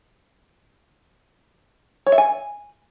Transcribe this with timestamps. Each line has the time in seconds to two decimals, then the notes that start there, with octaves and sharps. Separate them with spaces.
2.06 C#5
2.12 E5
2.18 G#5